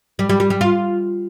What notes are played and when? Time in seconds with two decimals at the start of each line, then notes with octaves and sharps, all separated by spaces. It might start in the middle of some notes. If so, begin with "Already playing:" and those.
0.19 G3
0.29 G3
0.40 G3
0.50 G3
0.61 F4